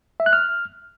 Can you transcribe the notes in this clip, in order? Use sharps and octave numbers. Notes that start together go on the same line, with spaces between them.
E5
F#6
F6